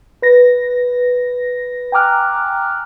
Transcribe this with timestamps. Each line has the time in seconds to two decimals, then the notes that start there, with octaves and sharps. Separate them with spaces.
0.22 B4 A#6
1.92 G5 G#5 A#5 D6 F6 F#6